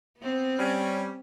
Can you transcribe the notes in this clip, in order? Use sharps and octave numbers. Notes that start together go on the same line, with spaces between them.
B3 C4
G3 C#4